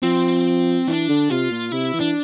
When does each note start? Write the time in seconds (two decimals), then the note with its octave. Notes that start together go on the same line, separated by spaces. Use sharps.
0.02 F3 C4
0.88 E3 D4
1.09 D3
1.30 C3 F4
1.51 A#2
1.72 C3 E4
1.93 E3
2.01 D4